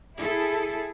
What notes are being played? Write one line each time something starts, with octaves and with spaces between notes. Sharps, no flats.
E4 G#4 A4